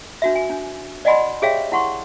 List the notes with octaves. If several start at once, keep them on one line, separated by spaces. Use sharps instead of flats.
D4 F#4 E5
G#5
D4
D5 D#5 F#5 G#5 B5 C6
G4 G#4 C#5 E5 F5 G5
E4 F#5 C6 C#6